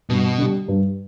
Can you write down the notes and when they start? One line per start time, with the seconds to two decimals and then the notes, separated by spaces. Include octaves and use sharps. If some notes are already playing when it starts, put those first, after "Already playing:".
0.10 G2 B2
0.38 D3 G3
0.68 G2